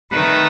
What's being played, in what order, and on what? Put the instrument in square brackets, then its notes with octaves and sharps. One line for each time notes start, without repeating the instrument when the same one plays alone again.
[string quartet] D#3 A3 D#4 [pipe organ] B4